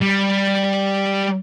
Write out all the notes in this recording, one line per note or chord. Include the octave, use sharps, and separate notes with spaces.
G3